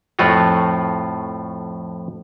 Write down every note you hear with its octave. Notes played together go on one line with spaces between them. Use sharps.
F2 A2 A3 F4 F#4